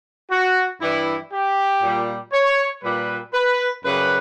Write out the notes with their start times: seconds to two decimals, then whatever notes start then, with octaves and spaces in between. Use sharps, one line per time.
0.31 F#4
0.81 G2 E3 G3 E4
1.32 G4
1.82 A#2 G3
2.32 C#5
2.83 A#2 G3 B4
3.34 B4
3.84 F#2 C#3 G3 B4